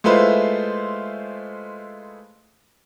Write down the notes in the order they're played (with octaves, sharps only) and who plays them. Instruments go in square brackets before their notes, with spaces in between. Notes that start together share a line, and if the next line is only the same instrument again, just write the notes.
[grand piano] G#3 A3 E4 F4 B4 C5